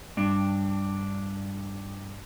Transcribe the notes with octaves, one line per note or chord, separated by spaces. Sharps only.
G2 D4